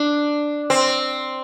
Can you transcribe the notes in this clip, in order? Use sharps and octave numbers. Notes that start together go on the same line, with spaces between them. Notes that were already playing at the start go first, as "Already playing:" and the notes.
Already playing: D4
C4